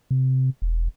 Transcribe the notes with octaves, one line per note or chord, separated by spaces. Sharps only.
C3
E1